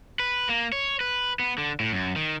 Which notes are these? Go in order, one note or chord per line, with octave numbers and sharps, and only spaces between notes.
B4
A#3
C#5
B4
B3
D3
A2
F#2
D#3